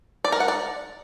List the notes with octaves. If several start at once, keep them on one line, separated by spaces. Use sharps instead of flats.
D5
A#4
F#5
D5